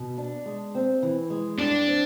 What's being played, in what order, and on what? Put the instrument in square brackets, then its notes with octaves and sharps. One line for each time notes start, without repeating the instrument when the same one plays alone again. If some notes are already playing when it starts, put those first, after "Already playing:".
Already playing: [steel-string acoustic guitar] B2
D4
G#3
C4
E3
G#3
[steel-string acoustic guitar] G2 [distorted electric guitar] D4
[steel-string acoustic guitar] C4